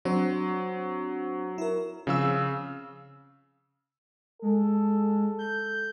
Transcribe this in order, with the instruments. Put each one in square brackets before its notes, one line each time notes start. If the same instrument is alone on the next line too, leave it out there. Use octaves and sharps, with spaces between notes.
[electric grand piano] F#3 [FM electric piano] C4 D4 C5
[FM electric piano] E4 A#4
[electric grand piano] C#3 F5 E6 [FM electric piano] F3 C4
[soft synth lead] G#3 [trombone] A4
[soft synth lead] G6